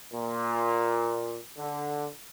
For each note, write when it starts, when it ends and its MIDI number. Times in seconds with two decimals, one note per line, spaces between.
0.12 1.38 46
1.58 2.06 50